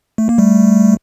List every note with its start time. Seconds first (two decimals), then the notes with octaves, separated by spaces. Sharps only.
0.18 A3
0.29 A#3
0.38 G3 A3